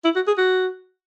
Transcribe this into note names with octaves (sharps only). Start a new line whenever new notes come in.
E4
F#4
G#4
F#4